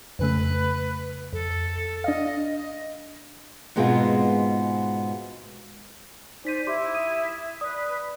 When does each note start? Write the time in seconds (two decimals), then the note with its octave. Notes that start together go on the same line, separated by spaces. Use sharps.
0.19 F2 C#3 A3 B4
1.33 F2 A4
2.04 D4 D#5 F5
2.56 D#5
3.76 G#2 B2 G#3 B3 C4 F4
6.45 D#4 C5 D5 B6 D#7
6.67 E4 G4 C6 D6
6.95 D#6 D#7
7.61 B4 D5 D#6